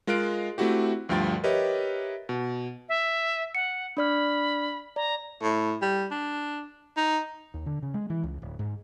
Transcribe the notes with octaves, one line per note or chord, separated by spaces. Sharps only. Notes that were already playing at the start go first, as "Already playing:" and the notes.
G#3 F4 A#4 F5 F#6 D7
A3 C4 E4 F#4 G4
D2 G2 F3 G5 C6 A6
G4 A#4 B4 C#5 D#5 E5
B2
E5
F#5 C#7
D4 D5 B5 F6
D5 A#5
A2
G3
D4
D#4
D#2
D3
C#3
G#3
E3
C#2
D1
G#2